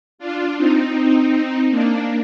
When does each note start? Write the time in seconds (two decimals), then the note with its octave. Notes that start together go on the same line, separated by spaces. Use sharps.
0.18 D4 F4
0.56 C4 D#4
1.70 A#3 D4